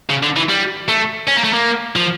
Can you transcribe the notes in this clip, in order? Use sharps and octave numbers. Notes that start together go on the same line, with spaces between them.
C#3
D3
E3
G3
A3
C#4
A#3
A3
A#3
F3